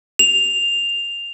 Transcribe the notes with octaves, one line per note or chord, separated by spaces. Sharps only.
F7